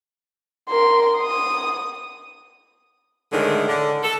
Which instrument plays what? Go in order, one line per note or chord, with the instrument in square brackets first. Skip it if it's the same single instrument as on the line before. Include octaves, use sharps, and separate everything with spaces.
[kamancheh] A#4 C6
D#6
[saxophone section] A2 D3 D#3 G#3
D3
A4